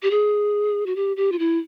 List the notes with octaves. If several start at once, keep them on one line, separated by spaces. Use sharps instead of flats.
G4
G#4
F#4
G4
G4
F4
E4